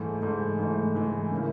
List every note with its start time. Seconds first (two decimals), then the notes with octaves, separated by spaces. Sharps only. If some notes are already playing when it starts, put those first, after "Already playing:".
Already playing: G#2 E3 A3
0.22 G#2 E3 A3
0.59 G#2 E3 A3
0.95 G#2 E3 A3
1.31 C#3 F3 A#3 C#4 E4